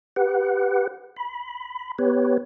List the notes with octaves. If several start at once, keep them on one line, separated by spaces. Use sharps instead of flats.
G4 B4 F#5
B5
B3 G4 B4 C#5